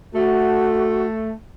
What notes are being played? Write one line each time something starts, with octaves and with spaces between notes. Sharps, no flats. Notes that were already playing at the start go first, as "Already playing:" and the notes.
A3 F#4